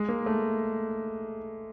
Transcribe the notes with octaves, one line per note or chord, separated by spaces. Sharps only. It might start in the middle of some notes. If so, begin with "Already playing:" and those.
Already playing: G#3
A#3
A3